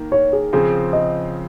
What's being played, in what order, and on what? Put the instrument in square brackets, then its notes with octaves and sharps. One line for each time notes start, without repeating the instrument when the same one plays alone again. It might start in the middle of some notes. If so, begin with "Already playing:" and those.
Already playing: [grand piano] D#3 A#3
[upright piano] C#5
G#4
[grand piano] C#3 F3 C4 [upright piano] G#4
[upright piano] D#5